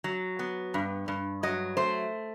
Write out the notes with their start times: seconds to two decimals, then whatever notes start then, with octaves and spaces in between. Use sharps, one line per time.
0.04 F#3
0.39 B3
0.74 G2
1.08 G2
1.43 F#3 D#5
1.77 A3 C5